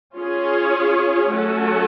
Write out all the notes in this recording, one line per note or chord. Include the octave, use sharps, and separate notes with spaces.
C#4 F4 G#4 C#5
F#3 A3 C#4 F#4 A4